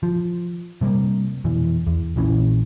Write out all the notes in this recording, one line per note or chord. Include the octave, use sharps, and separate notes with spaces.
F3
C3 G3 G#3 A#3
F2 B2 E3
E2
A#1 A#2 E3 C#4